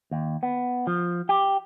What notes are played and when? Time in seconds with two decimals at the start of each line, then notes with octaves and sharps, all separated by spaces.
0.11 D#2
0.43 B3
0.87 F3
1.29 G4